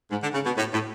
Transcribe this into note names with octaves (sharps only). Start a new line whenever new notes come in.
G#2
D3
C#3
B2
A2
A2